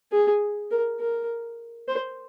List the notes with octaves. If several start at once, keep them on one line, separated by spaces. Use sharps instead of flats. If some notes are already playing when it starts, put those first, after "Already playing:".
G#4
A#4
A#4
C5